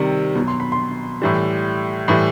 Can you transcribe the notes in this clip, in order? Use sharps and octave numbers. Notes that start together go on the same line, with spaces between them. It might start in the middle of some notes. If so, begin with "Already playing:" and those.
Already playing: C3 D#3 G3
B2
F#3
C6
B5
C6
A2 E3 G3
A2 E3 G3